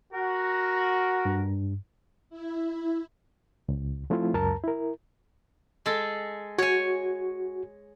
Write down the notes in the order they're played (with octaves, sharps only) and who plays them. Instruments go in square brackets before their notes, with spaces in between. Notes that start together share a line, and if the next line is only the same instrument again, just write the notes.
[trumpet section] F#4 [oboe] A#4
[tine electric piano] G2
[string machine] E4
[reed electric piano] C#2
F3 A3 C4 E4 F4
C#2 F#2 A#4 A5 A#5
E4 A#4
[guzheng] G#3 A4
[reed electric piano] F#4 [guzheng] C#5 G#5